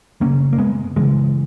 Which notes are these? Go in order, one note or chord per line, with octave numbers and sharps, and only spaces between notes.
F#2 C#3 A#3 C#4
A#3
G#3 B3
F#2 C#3 E3 G#3